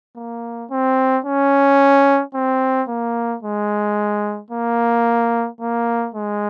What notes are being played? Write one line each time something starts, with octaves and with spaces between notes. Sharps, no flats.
A#3
C4
C#4
C4
A#3
G#3
A#3
A#3
G#3